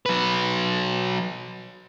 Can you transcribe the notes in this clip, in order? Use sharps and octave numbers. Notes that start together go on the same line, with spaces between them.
F#3 B4